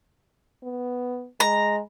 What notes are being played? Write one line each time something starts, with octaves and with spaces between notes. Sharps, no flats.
B3
G#3 A#5